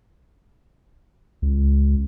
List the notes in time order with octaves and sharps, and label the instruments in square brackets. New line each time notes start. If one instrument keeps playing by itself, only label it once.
[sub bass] C#2